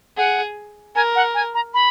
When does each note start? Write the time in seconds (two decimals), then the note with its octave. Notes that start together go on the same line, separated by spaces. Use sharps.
0.17 G#4 F#5
0.95 A#4 G#5
1.16 F#5
1.35 G#5
1.54 A#5
1.74 B5